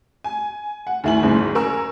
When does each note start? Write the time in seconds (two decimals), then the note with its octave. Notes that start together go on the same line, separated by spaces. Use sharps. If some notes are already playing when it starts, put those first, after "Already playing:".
0.24 G#5
0.87 F#5
1.04 D2 D#3 E4 G#5 F#7
1.23 F#1 D2 G#2
1.55 A#4 G#5 C#6 E6